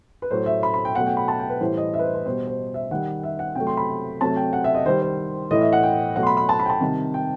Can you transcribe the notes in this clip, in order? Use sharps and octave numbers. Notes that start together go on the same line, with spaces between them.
B4
A2 F#3 A3 C5
E5
B5
B5
G5
B2 F#3 A3 F#5
G5
B5
A5
G5
B4
A2 E3 G3 C5
D#5
E5
B4
C5
B4
B2 G3 C5
C5
E5
D#3 G3 F#5
E5
F#5
C3 F#3 A3 G5
C6
B5
C3 F#3 A3 A5
G5
F#5
E5
D#5
D#3 G3 C5
C5
A2 E3 A3 D#5
E5
F#5
G5
B2 F#3 A3 F#5
C6
B5
B5
A5
B5
G5
A5
C3 D#3 G3
G5